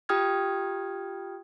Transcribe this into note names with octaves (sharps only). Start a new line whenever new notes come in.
F4 G4 G5 D#6 F6 G#6